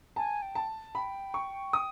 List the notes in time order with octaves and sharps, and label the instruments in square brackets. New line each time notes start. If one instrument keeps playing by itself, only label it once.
[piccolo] G#5 [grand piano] A5
[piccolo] G5
[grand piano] A5
[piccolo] G5 [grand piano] B5
[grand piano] C#6
D#6